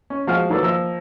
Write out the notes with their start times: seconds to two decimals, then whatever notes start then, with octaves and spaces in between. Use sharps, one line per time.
0.10 C#4
0.27 F3 G#3 F#4 F5 G#5 F6
0.50 D#3 F#3 A4 B4 D5
0.63 F3 A#3 E6